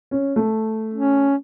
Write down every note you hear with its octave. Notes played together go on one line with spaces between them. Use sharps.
C#4
A3
C#4